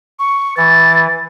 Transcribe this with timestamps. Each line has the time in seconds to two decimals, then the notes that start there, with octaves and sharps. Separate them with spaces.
0.19 C#6
0.57 E3 A6